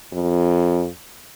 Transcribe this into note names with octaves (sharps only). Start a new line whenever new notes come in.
F2